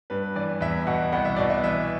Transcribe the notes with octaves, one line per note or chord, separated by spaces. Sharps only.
G2 B4
E3 D5
E2 E5
B2 F#5
C2 F#5
E5
B2 D5
E5
E3 E5